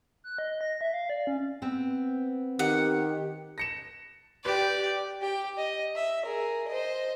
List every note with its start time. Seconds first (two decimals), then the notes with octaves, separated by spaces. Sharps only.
0.24 F#6
0.38 D#5
0.61 A#6
0.81 E5
0.93 F5
1.10 D5
1.27 C#4
1.62 B3 C4
2.59 D#3 G4 F#5
3.58 A#6 C#7 E7
4.45 G4 B4 D5
5.21 G4 G5
5.57 D#5
5.95 E5
6.25 G#4 A#4
6.67 C5 D#5